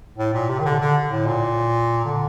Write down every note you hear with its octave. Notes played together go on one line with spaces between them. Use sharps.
A2
A#2
C3
D#3
D3
D3
A2
A#2
D3